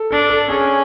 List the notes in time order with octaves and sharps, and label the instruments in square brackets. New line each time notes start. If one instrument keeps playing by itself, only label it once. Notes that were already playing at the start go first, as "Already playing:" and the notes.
Already playing: [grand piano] A4
[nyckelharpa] D4 [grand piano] A4
[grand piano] A4
[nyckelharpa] C#4 [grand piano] G#4